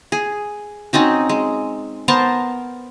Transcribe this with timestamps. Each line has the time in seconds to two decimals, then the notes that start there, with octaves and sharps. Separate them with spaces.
0.12 G#4
0.93 C4 C#4 D#4 F#4
1.29 G#3
2.08 B3 A#4 C5 A5